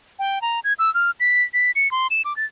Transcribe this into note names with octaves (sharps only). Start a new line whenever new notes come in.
G5
A#5
G#6
E6
F6
B6
B6
C#7
C6
E7
D6
A6